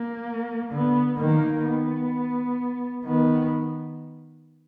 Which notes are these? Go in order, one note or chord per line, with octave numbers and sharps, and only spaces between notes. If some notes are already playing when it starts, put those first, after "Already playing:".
Already playing: A#3
D3 B3
D#3 A#3
B3
D#3 B3